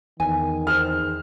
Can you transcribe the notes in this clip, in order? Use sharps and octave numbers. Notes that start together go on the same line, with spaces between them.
E2 D#3 G#5
G#4 C5 F6